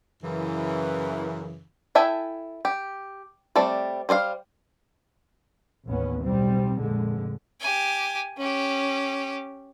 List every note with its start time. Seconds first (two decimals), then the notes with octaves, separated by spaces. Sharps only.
0.23 F#2 C#3 E3
1.95 E4 A4 E5 G5 G#5
2.65 G4
3.56 G3 A3 C4 D5
4.09 G3 C5 D5 F5
5.86 A1 D#2 B3 C#4
6.23 B1 G3 C4
6.81 F1 A#1 D3 G#3
7.61 G4 G#5
8.38 C#4 G4